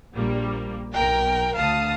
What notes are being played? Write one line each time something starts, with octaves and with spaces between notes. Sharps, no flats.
A#1 G3 A#3
B1 A#4 G5
D2 F5 A5 D#6